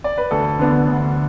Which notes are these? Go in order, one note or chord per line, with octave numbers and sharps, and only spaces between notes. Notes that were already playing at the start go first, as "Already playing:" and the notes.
D5
B4
D2 A4
D3 B3 D4
D2